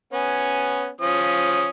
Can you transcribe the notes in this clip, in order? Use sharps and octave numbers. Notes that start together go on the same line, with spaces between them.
B3 C#4 G#5
F3 C#4 D#6